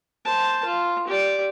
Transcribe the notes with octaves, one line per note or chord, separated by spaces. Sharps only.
C5 A5
F4
G4 D5